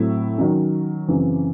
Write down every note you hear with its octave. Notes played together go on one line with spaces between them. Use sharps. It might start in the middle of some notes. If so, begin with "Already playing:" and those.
Already playing: A2 F#3 C4 E4
D#3 F#3 C#4
F#2 C#3 E3 C4